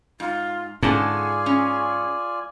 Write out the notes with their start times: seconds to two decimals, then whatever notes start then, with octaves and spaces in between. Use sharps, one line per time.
0.20 G#2 F4
0.83 G#2 D3 C#4 F4 G#4 D5 G#5 A5
1.46 C#4